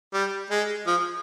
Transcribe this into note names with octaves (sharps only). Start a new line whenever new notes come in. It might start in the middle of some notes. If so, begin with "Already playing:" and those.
G3
G#3
F3